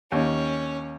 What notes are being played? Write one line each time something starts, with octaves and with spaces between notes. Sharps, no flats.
D#2 C#4